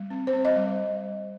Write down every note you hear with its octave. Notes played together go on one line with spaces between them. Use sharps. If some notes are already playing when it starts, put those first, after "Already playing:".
Already playing: G3
C4
C5
C4
D#5
G3